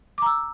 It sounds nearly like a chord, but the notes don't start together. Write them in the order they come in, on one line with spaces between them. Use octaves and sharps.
D6 A#5 E6